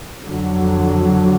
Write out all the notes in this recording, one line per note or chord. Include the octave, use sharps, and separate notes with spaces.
F2 D3 F#3